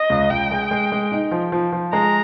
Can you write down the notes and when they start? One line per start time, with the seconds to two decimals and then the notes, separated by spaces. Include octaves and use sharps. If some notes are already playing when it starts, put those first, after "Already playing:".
Already playing: D#5
0.10 C#2
0.30 C#2 G5
0.51 G#3
0.71 G#3
0.92 G#3
1.12 D#4
1.31 F3
1.52 F3
1.72 F3
1.93 G#3 A#5